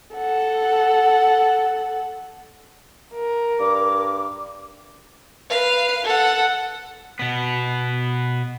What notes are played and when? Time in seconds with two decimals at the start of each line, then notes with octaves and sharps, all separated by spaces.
0.14 A4 F#5
3.14 A#4
3.60 G2 D6
5.50 B4 F5
6.05 A4 F#5
7.19 B2 B3